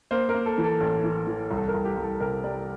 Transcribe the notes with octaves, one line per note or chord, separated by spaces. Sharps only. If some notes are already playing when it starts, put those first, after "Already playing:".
A#3 C5
A#4
A#3
A4
E3
A4
A1
E3
E3
C2
A4
A#4
C2
G4
C2
A4
C3 A#4
G3 D5